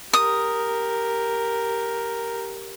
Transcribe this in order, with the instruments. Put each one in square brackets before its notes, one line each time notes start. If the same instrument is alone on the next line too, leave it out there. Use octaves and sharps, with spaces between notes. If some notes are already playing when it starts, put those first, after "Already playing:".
[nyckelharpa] G4 A#4 [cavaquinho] D#6